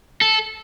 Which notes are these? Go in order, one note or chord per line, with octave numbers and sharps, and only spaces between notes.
A4